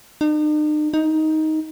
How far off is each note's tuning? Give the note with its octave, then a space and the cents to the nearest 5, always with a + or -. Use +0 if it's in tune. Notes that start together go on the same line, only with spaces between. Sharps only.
D#4 -45
D#4 +10